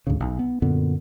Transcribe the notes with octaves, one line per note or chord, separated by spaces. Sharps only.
D2 G#2 C#3
B1
B3
F#2 A#2 D3 B3